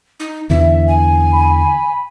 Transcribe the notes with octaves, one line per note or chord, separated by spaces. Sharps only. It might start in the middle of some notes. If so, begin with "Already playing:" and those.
D#4
E2 D3 E3 E5
G#5
B5